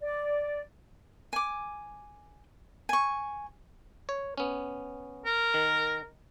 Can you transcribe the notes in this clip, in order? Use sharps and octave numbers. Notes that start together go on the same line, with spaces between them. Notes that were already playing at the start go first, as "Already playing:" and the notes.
D5
G#5 D6
G#5 C#6
C#5
B3 C#4
A#4
D#3